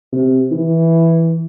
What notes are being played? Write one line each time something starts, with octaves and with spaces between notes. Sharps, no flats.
C3
E3